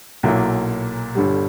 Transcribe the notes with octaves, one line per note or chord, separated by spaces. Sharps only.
B1 A#2 F#3 A#3 E4
G1 G2 D3 G3